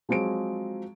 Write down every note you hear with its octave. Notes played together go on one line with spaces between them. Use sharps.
F3 F#3 G#3 C4 D7